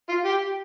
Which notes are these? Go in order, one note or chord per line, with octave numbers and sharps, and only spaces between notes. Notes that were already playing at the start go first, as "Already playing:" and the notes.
F4
G4